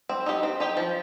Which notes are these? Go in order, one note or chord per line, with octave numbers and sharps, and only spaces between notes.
C4
D#4 G4
C4
D#4 G4
F3